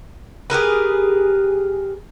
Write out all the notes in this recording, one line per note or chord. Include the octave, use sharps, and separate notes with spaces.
G4 G#4 A#4 B4